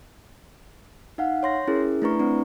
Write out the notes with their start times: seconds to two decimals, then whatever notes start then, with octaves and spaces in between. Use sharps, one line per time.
1.18 D#4 F5 F#5
1.43 C#5 C6 A#6
1.67 C#4 E4 G#4 A#4
2.02 A3 D4 E4 B4 A#5 C#6
2.19 C4 D4